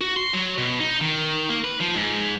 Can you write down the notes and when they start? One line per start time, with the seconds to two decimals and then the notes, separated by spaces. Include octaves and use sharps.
0.01 F#4
0.16 C6
0.33 F#3
0.58 B2
0.80 D#4
1.01 D#3
1.49 A#3
1.64 B4
1.80 F3
1.95 G#2